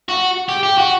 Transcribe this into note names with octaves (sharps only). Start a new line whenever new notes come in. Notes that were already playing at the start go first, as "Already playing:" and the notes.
F#4
G4
G4
F#4